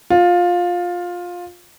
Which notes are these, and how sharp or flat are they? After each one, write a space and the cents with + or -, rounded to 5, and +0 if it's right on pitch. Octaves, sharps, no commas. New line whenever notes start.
F4 +15